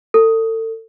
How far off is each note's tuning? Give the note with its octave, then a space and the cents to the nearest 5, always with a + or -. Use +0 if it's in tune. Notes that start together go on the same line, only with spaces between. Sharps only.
A4 +35